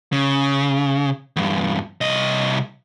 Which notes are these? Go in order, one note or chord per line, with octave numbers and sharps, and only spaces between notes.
C#3
E2 G2
C2 D#5